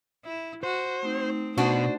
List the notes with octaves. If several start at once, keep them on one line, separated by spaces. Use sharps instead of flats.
E4
F#4 C5
A3 C4 D#4
B2 D4 F#4 C5